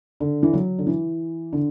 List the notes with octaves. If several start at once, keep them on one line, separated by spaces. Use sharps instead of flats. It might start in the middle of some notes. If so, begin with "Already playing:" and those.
D3
E3
F#3
D3
E3
D3